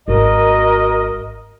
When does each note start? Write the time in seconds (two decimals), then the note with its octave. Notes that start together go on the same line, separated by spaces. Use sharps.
0.08 G#1 A#3 F#4 A#4 D#5